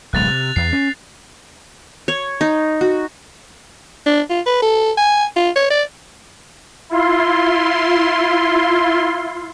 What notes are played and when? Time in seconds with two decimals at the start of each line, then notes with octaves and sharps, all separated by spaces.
0.13 D1 B1 G#3 F#6 A6 F7
0.27 C3
0.56 E2 C7
0.73 C#4
2.08 C#5
2.41 D#4
2.81 F#4
4.06 D4
4.30 F4
4.46 B4
4.62 A4
4.97 G#5
5.36 F4
5.56 C#5
5.70 D5
6.90 E4 F4 C6